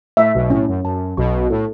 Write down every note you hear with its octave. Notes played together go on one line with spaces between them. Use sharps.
A2 A3 E5
B1 B2
A2 C#4
F#2
F#2 A5
B1 B2 C#6
A2 A4